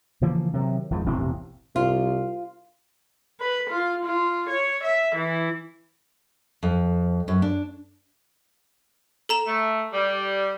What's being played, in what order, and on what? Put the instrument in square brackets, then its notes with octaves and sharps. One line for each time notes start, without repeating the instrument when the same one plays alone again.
[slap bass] C#3 E3 F3 A#3
C3 D#3 F#3
G#1 F2 G#2
E1 A1 C3 C4
[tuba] C2 [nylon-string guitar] F4
[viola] B4
F4
F4
C#5
E5
E3
[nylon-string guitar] F2
F#2
D4
[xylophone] A4 A#5 E7
[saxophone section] A3
G3